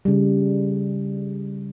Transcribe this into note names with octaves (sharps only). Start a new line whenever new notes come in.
C#3 G3